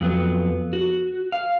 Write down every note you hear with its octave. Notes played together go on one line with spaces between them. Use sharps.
F2 F#3 B3
F#4
F5